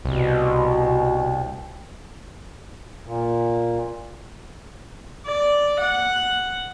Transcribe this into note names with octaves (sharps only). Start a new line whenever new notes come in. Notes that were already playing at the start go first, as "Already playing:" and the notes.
C2 B2
A#2
D5
F#5